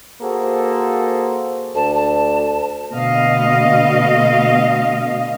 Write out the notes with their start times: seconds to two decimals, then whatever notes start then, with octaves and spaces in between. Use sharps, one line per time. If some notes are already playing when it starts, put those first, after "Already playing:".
0.21 A#3 F#4 G#4 A4 C5
1.75 D2 A5
1.94 A5
2.93 B2 D3 A3 D#5 F5